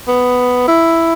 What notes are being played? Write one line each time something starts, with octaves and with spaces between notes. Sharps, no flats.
B3
E4